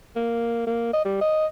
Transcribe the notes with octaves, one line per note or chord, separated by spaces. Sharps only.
A#3
A#3
D#5
G3
D#5